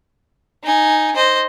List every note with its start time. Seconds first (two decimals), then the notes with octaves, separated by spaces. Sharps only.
0.64 D#4 G#5
1.16 C5 D#5